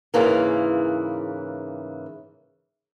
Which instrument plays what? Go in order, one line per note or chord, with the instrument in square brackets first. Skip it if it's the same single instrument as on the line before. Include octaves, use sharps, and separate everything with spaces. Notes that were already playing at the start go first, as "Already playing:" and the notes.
[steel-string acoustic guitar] G#2 C#3 E3 A#3